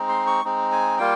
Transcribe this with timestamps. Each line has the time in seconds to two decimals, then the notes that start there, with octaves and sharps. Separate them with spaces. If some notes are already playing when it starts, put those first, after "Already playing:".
Already playing: G#3 C4 D#4
0.09 C6
0.27 C#6
0.45 G#3 C4 D#4
0.72 G#5
0.99 G3 A#3 F4 G5